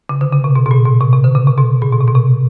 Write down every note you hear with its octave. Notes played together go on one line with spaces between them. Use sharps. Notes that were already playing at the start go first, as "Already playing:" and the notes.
C#3
D3
C#3
C3
B2
B2
A#2
B2
C3
C3
D3
C#3
C3
B2
A#2
B2
C3
B2
C3